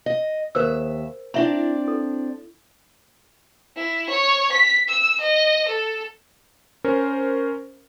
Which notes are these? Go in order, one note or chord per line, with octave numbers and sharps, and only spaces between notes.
D#5
D#2 A#4 C5 E5 E6
C4 D4 E4 D5 E5 A#5
A4
E4
C#5
B6
E6
D#5
A4
C#4 A#4 C5